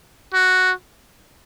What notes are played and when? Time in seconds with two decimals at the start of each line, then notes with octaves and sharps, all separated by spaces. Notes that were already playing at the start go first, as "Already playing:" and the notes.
0.34 F#4